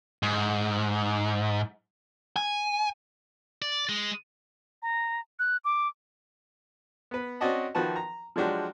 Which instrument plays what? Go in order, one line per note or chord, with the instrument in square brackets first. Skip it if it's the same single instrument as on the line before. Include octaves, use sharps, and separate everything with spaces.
[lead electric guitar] G#2
G#5
[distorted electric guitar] D5
G#3
[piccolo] A#5
F#6
D6
[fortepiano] B3 B4
C4 C#4 F#4 D5 D#5 A5
D#3 F3 F#4 B4 A5
A#5
F3 F#3 G#3 D4 F#4 G4